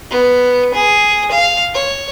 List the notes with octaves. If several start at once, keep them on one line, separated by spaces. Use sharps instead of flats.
B3
G#4
F5
C#5